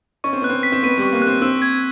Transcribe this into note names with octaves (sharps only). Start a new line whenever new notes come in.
C#4 C#6
C4
B3 F#6
C4
B6
C4
B3 D#7
G3 C#6
A#3
C4 F#6
C4 E6
G#6